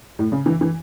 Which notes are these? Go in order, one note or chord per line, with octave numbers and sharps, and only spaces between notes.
A2
C#3
E3
E3